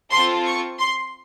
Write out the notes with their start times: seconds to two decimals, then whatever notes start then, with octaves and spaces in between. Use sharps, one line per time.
0.11 C4 F4 A4 C6
0.46 C#6
0.79 C6